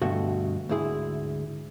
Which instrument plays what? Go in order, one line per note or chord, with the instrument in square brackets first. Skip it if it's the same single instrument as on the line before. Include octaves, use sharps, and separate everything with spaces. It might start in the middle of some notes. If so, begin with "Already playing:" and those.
[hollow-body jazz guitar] D2 G2 B2 A3 F#4
D2 G#2 E4 G#4